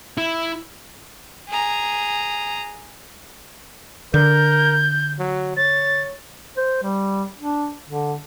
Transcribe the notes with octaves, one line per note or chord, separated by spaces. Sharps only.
E4
G#4 A#5
D3 A#4 G6
F#3
C#5 A6
C5
G3
D4
D3